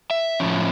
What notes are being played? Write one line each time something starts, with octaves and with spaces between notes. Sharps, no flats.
E5
A2 F3 C#4